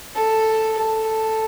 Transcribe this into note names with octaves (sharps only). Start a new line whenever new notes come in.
A4
A4